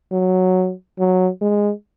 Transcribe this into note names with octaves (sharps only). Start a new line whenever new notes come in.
F#3
F#3
G#3